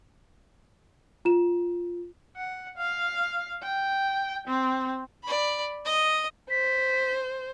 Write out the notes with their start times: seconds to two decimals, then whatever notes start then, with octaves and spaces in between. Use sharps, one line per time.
1.25 F4 E7
2.37 F#5
2.77 F5
3.63 G5
4.47 C4
5.24 D5 B5
5.85 D#5
6.50 C5 B6